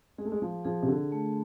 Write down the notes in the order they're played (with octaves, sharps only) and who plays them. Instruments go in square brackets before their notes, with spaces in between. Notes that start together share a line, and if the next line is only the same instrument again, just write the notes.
[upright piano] G#3 [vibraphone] G#4
[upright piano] A3
G#3
F3
[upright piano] F3 [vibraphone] G#4
[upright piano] C3
D3
[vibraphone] A3